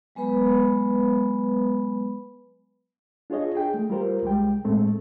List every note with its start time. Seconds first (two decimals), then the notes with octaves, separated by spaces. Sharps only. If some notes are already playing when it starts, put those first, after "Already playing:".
0.15 F#3 G#3 B3 B4 B5
3.30 D4 F4 G#4 C#5 D#5
3.55 G#4 G5
3.74 A3
3.90 G3 F4 A#4 C5
4.22 C2 G3 G#3 G5
4.65 A2 G#3 A3 C4